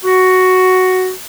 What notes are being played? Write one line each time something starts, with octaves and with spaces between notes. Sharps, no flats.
F#4